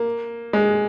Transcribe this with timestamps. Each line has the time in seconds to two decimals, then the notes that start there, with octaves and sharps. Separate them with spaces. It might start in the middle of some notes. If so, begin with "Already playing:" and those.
Already playing: A#3
0.53 G#3